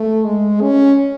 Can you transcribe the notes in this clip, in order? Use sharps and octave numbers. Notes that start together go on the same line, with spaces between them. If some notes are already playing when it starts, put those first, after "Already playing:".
Already playing: A3
G#3
C#4